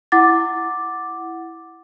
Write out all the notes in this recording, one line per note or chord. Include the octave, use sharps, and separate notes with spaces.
E4 F#5 D6 A6